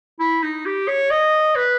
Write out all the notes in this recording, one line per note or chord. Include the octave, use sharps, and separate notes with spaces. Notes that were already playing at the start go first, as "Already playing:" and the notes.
E4
D#4
G4
C#5
D#5
B4